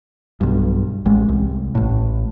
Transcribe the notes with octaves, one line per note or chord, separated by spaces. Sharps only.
B1 G2
A1 G#3
C2
A1 A2